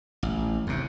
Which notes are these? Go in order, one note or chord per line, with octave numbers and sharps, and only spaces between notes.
A1
D#2 C3